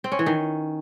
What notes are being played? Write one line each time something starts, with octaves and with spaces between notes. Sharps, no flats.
C4
C#4
E3
D#3